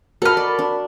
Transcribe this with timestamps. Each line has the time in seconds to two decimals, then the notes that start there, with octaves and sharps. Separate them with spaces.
0.22 F#4 A4 A#4 D#5 B5 F6
0.37 D5
0.59 D4